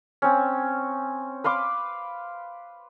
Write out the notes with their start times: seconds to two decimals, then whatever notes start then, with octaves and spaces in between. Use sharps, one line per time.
0.22 C4 C#4
1.44 B4 F5 C6 D6